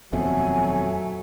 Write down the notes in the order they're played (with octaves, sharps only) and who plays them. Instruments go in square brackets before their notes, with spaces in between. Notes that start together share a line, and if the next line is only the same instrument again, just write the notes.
[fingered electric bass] D#1 F2 B2 [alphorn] F#3 [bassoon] A3 [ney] G#5